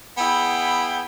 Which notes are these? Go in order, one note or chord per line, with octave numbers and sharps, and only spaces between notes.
B3 E4 G#4 G5